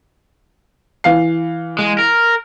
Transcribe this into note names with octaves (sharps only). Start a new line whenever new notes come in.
E3 F5 C7
G#3
A#4